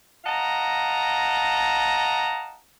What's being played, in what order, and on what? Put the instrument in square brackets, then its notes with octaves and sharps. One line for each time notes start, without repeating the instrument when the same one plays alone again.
[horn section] D#5 F5 F#5 A5 A#5